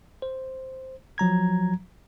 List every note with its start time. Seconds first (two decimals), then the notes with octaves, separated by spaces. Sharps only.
0.22 C5
1.18 F3 F#3 A#5 G#6